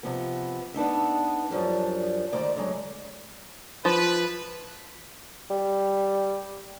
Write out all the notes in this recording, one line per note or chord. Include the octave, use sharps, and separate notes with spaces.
C3 F3 B3
B3 D4 D#4 E5
F#2 F3 G3 D4
D2 G#2 D#3 C5 D5
D3 F#3 G#3
F3 B4
G3